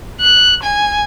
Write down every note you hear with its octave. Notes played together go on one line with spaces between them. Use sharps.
F#6
G#5